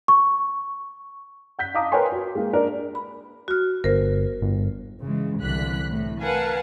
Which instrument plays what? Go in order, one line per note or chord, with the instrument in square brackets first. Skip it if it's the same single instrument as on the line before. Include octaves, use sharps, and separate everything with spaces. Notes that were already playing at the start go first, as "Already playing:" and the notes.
[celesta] C#6
[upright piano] F#5 G6 B6
F5 A5 A#5 D6 D#6
A#4 B4 C#5 G5 G#5 C6
F#4
G#3 A#3
D4 A#4 D5
[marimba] B5
F#4 F6
[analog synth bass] G1 [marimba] A#4 C5
[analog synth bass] G1
[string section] C#3 E3 G#3
C2 D3 E3 F#6 B6
A2
A#4 B4 F5 F#5 G#5 A5